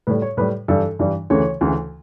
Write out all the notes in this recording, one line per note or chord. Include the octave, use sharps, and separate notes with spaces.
A2 G3 B4
C#5
A2 G3 B4
G2 E3 G3 A4
G2 E3 G3
D2 C#3 E3 A3 C#5
D2 C#3 E3 A3